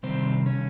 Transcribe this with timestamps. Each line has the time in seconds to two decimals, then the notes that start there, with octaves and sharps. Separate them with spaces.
0.03 C3 D#3 G3 C4 C5
0.46 C#4 C#5